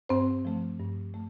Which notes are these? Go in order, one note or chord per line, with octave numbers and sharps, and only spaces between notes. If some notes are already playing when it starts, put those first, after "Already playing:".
G2 C4 C5
F3 A3
G2
A3